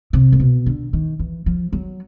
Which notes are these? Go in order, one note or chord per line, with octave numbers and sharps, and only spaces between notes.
C3
A#2
B2
D3
D#3
E3
F3
F#3